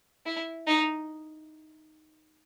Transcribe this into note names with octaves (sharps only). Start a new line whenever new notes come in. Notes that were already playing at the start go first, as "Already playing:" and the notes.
E4
D#4